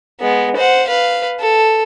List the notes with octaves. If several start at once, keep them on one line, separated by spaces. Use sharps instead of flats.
G#3 B3
C5 F#5
B4 F5
A4